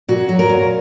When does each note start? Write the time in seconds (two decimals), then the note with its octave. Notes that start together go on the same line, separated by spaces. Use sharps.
0.08 A#2 F#4
0.29 F#3
0.39 A#4
0.49 A#2